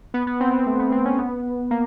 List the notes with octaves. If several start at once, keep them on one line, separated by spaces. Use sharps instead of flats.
B3
B3
C4
B3
A3
B3
C4
C#4
B3
A#3